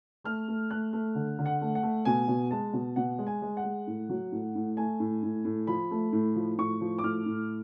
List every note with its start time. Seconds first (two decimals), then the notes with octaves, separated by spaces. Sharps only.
0.24 A3 F6
0.48 A3
0.70 A3 F#6
0.93 A3
1.15 D3
1.39 D3
1.46 F#5
1.61 A3
1.75 F#5
1.83 A3
2.05 B2 G#5
2.28 B2
2.51 G#3 A5
2.73 B2
2.96 B2 F#5
3.18 G#3
3.27 G#5
3.42 G#3
3.57 F#5
3.64 G#3
3.87 A2
4.09 F#3
4.32 A2
4.55 A2
4.77 A3 G#5
5.00 A2
5.23 A2
5.45 A2
5.67 F3 B5
5.91 A3
6.13 A2
6.35 F3
6.58 A2 C#6
6.81 F3
6.98 D6
7.03 A2 F6
7.26 A2